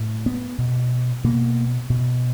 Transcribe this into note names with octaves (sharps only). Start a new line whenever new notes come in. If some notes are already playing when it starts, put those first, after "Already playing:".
Already playing: A2
B3
B2
B2 A#3
B2